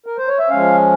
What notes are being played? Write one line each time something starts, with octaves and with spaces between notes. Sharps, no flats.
A#4
C5
C#5
E5
F3 G#3 C#4 F5